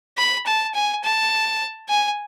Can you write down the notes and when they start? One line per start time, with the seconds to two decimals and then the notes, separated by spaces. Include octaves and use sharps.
0.18 B5
0.46 A5
0.74 G#5
1.04 A5
1.89 G#5